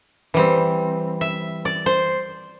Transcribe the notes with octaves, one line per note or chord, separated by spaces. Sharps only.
E3 G3 C4
E5
D5
C5